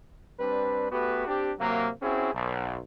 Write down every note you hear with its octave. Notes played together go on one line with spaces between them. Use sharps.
G3 C4 D4 B4
A3 B3 F#4 G4 B4
C4 D4 G4
C3 F#3 A#3
C4 C#4 E4 F#4 G#4
B1